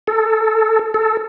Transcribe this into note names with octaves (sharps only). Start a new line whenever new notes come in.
A4
A4